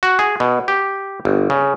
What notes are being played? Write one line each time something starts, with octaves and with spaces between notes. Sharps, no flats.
F#4
G#4
B2
G4
G1
C#3